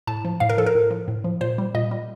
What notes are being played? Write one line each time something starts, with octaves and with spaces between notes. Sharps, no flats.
A2 A5
F3
A2 F5
A#4
F3 A4
A#4
A2
F3
A2
F3
A#2 C5
G3
A#2 D#5
G3